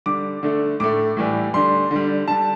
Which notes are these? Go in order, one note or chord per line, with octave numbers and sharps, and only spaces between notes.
D3 G3 D6
D3 A3
A2 A3 D6
A2 E3 G3
D3 G3 C6
D3 G3
D3 G3 A5